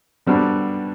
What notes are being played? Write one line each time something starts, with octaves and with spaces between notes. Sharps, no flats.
D3 G3 B3 D4 F#4